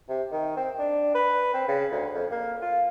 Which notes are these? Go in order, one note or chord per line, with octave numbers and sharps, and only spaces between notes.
C3
D#3
C4
D4
B4
C4
C#3
D2
F2
A#3
F4